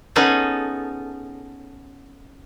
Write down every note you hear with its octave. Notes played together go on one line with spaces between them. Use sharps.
B3 C#4 D#4 G#4 A4